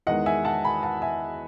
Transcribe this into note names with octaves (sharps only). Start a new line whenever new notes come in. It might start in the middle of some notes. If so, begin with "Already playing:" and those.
E2 D#3 G#3 D#5 F#5
E5 G#5
F#5 A5
G#5 B5
F#5 A5
E5 G#5